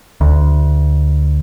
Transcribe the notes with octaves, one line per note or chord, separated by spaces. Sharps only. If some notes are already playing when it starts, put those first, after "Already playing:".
D2